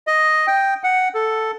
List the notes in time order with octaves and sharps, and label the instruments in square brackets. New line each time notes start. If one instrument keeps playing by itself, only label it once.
[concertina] D#5
G5
F#5
A4